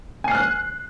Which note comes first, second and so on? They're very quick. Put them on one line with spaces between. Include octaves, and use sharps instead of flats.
G#5 C7 F6 F#6